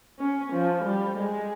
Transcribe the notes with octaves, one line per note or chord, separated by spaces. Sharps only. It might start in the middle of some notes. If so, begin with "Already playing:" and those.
C#4
F3
G3
G#3